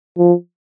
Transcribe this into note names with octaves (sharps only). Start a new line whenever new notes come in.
F3